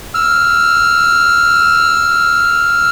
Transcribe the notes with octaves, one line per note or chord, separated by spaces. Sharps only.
E6 F6